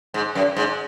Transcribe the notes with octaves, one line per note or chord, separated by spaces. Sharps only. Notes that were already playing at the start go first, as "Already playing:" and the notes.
G#2
F#2
G#2